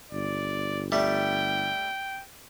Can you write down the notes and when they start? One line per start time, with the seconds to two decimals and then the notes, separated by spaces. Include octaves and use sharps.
0.12 G1 D5
0.92 G3 A3 G5